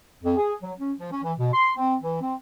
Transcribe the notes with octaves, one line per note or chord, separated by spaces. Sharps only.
F2
G#4
F#3
C#4
F3
C#4
E3
B2
C6
C4
E3
C4